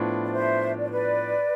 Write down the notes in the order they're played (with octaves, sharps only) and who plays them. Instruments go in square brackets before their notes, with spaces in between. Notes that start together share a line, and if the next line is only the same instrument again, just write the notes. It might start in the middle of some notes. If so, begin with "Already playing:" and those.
Already playing: [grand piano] A2 F3 B3 D4 F4
[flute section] D5
C5 E5
D5
C5
B4 D5